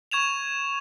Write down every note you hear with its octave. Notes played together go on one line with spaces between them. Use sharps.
C#6 G#6 E7 F7